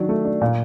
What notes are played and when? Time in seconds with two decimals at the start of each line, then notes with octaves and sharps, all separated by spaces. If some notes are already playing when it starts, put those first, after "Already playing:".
Already playing: D#3 F#3 D4
0.09 A3
0.25 D4
0.41 A#2